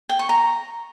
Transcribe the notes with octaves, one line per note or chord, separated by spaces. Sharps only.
G5
C#6
A#5